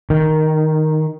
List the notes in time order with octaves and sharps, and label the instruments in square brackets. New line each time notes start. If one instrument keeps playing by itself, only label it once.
[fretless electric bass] D#3